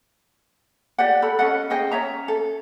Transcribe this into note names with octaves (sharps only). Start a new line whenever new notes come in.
G4 D5 F#5
A4 B5
C#4 A4 D#5 F#5
G#4 C5 D#5 G5
C#4 C#5 E5 A#5
A4